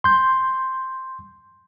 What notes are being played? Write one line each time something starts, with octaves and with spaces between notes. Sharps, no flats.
C6 G6